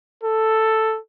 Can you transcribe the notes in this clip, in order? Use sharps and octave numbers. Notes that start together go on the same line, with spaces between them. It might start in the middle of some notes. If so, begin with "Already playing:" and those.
A4